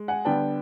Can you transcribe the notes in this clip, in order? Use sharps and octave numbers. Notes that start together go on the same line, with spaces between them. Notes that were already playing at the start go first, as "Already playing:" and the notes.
Already playing: G#3
F#5 G#5
D3 G3 B3 G5 A5